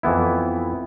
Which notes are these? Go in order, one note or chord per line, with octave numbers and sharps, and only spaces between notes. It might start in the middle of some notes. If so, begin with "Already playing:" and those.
F2 E3 B3 E4